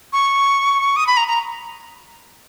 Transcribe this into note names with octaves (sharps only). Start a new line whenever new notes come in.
C#6
D#6
B5
A#5
A#5